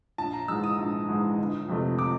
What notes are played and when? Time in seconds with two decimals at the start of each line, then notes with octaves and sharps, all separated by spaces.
0.18 A#1 A5
0.33 A#5
0.48 G#2 E3 G#3 E6
0.64 D#6
0.78 A#1
1.08 G#2 E3 G#3
1.38 G1
1.68 F2 C3 F3 A3
1.99 D6